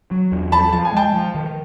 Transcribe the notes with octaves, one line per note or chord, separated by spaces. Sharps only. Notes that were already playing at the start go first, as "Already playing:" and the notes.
F#3
E2
F3 A5 B5
F3 A5
G#5
G#3 G5 A5
F3
D#3